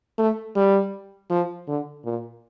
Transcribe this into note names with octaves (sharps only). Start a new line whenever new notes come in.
A3
G3
F3
D3
A#2